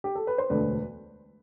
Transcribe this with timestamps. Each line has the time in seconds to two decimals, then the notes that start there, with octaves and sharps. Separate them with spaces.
0.04 G4
0.15 A4
0.27 B4
0.38 C5
0.50 E1 D2 D3 A3 D4 B4 D5